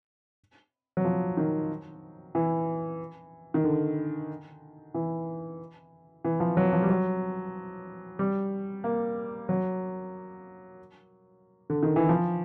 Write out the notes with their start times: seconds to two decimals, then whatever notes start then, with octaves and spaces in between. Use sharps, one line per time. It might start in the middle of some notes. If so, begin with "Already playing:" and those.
0.97 F#3
1.05 F3
1.37 D#3
2.35 E3
3.54 D#3
3.64 D3
4.94 E3
6.24 E3
6.40 F3
6.57 F#3
6.73 F3
6.82 G3
6.89 F#3
8.19 G3
8.84 A#3
9.49 F#3
11.70 D3
11.83 D#3
11.96 E3
12.09 F3